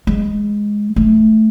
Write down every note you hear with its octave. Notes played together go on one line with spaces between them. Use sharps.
G#3
A3